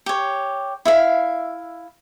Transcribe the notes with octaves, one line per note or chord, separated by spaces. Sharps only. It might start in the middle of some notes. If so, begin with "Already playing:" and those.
G4 C#5
E4 E5 F5